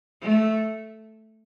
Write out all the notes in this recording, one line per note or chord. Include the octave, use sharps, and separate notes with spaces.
A3